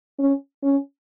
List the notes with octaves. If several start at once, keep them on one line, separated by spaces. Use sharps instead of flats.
C#4
C#4